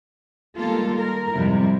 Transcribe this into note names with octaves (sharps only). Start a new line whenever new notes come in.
D#3 G3 G#3 A#3 F4 A4
A#4
F2 G#2 C3 G3 E4